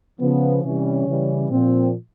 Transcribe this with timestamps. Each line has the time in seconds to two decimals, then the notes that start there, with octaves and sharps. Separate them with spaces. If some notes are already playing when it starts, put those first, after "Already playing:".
0.20 C#3 F3 B3
0.63 C3 E3 G3 C#4
1.07 C#3 E3 G3
1.50 A#2 F3 C4